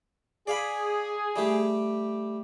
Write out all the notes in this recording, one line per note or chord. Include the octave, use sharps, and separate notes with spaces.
G#4 D5 F5 B5
G3 A3 G4